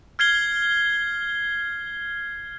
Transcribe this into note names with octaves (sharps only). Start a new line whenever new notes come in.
F6 G#6 C7 G7